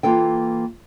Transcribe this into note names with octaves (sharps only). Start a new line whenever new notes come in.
E3 A#3 F4 A4 G5